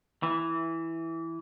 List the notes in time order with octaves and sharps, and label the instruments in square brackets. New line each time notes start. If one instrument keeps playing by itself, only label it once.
[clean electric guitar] E3